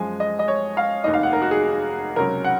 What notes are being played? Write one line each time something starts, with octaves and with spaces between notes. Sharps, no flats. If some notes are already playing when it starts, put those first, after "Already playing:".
Already playing: F#2 F3 G#3 G#5
D#5
D#5
C#5
F5
F1 D#2 D#3 D#5
F5
F#5
A#4
F#4
G#4
C#2 C3 F#3 C#4 A#4
F#5